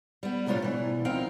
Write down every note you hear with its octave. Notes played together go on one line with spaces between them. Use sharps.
G3 B3
A2 C3 G3 D4 F4 C#5
B2 E3
D#2 F3 C4 D#4 F5 G5